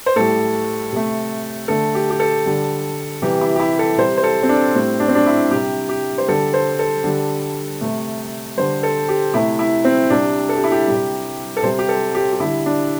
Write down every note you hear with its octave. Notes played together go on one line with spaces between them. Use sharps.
C5
A2 G3 A4
C3 A3
D3 A3 A4
G4
G4
A4
D3 G3
C3 E3 G3 G4
E4
G4
E4
A4
C3 G3 C5
C5
A4
C4
D4
A2 G3 C4
D4
C4
D4
E4
C3 G3 G4
G4
C5
D3 G3 A4
C5
A4
D3 G3
C3 A3
D3 G3 C5
A4
G4
C3 A3 E4
E4
C4
C3 G3 D4
A4
G4
E4
G4
C3 G3
A4
C3 G3 C5
G4
A4
G4
G4
D3 G3 E4
D4